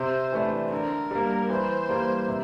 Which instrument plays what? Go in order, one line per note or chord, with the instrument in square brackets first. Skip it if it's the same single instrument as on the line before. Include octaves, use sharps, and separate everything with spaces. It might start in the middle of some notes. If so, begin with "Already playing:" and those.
Already playing: [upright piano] C3 [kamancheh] C5
[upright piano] E3 A3 D4
[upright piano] D3 [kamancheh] A#4
[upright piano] G3 A#3
[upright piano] E3 [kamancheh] C5
[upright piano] G3 A#3
C3